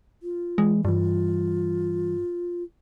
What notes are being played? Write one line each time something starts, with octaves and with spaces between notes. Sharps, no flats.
F4
E3 G#3
G2 E3 G3 F4